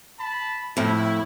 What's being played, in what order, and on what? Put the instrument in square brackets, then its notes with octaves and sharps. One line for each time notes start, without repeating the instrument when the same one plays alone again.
[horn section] A5 B5
[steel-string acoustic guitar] F2 A2 [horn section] E4